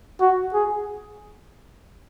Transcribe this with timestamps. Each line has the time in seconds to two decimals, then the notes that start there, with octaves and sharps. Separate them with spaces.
0.21 F#4
0.54 G#4